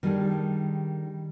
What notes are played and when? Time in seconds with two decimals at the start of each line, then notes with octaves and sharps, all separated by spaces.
0.03 D#3 G3 D4 G#4 A4